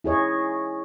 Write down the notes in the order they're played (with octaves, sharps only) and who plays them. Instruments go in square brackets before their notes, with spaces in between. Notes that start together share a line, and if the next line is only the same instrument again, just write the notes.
[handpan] E4 G#4 C#5 D#5